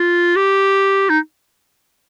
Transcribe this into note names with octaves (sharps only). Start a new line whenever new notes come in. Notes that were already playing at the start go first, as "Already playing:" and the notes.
Already playing: F4
G4
D#4